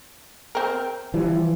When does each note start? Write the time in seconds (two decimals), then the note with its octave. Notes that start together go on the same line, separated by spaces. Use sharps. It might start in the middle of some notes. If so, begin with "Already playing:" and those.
0.55 C4 A#4
1.14 E3 F3 G3